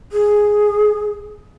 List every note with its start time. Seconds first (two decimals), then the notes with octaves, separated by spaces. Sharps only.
0.12 G#4